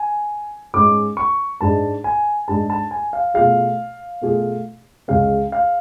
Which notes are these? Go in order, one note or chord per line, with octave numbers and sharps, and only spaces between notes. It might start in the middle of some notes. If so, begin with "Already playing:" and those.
Already playing: G#5
G#2 G#3 C#4 G#4 D6
C#6
G#2 G#3 D4 G#4 A5
G#5
G#2 G#3 D4 G#4 A5
A5
G#5
F5
B2 A3 F4 G#4 F5
B2 A3 F4 G#4
C#2 C#3 G#3 C#4 F5
F5